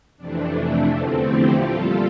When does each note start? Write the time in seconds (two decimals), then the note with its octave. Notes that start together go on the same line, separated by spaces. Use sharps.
0.17 F2 C3 E3 A3 D4
0.52 D4
0.86 E2 D3 F3 A3 C4
1.20 E4 G4
1.54 A#2 G3 F4 A4